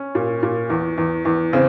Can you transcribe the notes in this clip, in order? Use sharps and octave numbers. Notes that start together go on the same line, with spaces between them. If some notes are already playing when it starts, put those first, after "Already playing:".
Already playing: C#4
A#2
A#2
E2
E2
E2
C#3 C4